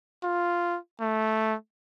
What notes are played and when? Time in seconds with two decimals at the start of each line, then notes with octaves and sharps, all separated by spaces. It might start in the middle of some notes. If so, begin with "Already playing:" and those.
0.23 F4
1.00 A3